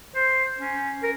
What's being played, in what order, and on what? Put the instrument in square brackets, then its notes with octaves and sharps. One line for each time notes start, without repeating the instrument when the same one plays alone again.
[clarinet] C5
C#4
A#4